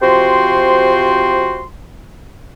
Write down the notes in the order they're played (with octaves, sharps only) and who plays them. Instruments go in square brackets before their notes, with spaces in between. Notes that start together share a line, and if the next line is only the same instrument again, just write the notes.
[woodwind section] C3 F3 F#4 G5 C6